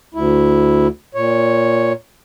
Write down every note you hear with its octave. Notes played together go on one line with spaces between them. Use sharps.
D2 E4
A#2 C#5